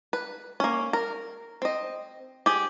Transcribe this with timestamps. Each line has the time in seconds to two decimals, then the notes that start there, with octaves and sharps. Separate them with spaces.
0.13 B4
0.60 A#3 C#4
0.93 A#4
1.62 C4 D#5
2.46 G4 G#4